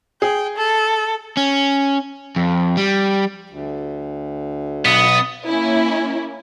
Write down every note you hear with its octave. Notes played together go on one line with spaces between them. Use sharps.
G#4 G5
A4
C#4
F2
G3
D2
B1 B3 D#6 A6
A#3 C#4 E4